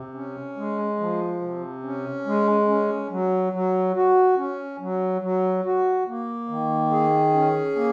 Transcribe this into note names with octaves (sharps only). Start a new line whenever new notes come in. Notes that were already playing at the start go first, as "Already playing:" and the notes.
Already playing: C3
C#4
G#3
F3
C3
C#4
G#3
C#4
F#3
F#3
F#4
C#4
F#3
F#3
F#4
A#3
D#3
G#4
C#4
A#3